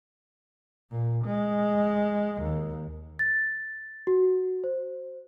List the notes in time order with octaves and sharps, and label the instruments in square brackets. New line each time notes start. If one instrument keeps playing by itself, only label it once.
[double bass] A#2
G#3
D#2
[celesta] A6
F#4
C5